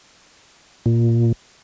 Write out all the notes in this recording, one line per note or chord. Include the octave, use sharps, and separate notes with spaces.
A#2